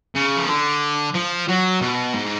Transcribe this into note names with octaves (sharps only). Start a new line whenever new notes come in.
C#3
F3
D3
F3
F#3
B2
G#2